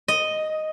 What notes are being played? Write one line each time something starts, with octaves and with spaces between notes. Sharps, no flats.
D#5